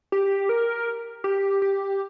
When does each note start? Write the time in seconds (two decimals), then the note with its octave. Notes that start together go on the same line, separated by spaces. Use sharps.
0.12 G4
0.49 A#4
1.24 G4
1.62 G4